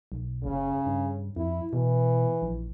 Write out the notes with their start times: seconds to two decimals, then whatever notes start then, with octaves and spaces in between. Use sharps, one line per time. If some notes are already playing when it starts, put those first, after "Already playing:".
0.12 B1
0.44 F#1 C#3
0.86 G2
1.36 F2 E4
1.73 B2 E3
2.42 A#1